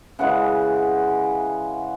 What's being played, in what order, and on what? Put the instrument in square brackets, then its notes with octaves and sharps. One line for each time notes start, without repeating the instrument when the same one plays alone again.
[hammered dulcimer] C#3 E3 G#3 F#5